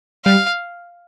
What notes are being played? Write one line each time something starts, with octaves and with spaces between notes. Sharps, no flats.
G3 F5